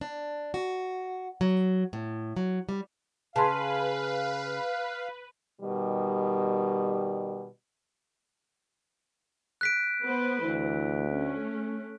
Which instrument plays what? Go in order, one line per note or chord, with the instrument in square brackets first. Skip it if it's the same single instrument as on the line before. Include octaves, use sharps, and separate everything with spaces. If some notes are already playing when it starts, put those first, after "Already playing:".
[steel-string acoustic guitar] D4
F#4
F#3
A2
F#3
G3
[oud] C#3 [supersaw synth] B4 [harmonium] F5 [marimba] A5 C6
[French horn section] B2 D#3 G3
[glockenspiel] F#6 B6 D7
[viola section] B3 B4 C5
[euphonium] D2 [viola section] E3
[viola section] A3 C#4